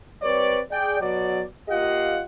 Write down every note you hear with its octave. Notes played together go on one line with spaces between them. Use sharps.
G3 C4 B4 C#5 D5
G#4 D5 G5
B2 F#3 D5
A#3 F4 G4 D#5 F5 F#5